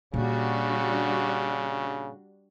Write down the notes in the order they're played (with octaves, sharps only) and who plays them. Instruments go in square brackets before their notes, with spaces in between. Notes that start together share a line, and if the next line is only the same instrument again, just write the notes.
[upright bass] A#2 A#3 [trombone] C#3 [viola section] G3 D4 F#4